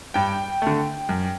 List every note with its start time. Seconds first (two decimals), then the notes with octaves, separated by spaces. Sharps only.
0.14 G2 G5
0.62 D3 A3
1.09 F#2